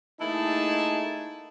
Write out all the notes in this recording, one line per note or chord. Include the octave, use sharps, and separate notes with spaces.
A3 A#3 D#4 E4 G#4 A5